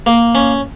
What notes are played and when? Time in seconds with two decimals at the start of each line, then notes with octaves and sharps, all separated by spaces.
0.06 A#3
0.35 C#4